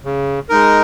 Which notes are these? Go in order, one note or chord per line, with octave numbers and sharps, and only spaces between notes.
C#3
G#3 D#4 A#4